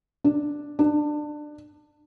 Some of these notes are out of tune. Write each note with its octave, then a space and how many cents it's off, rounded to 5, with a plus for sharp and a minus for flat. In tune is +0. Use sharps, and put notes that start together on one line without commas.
D4 +0
D4 +20